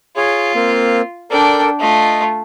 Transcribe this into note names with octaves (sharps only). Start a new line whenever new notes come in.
F4 G#4 C#5
A#3 C4
D4 A4 A#4 D5 G5
A3 F4 D#5